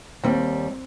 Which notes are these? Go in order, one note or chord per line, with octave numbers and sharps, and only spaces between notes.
D#2 G3 C4